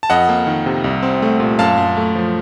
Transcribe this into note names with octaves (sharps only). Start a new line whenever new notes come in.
A5
F2 D#5 F#5
A#3
D#3
C3
C2
C4
A3
A#2
F#2 F5 A5
F#2
A3
F3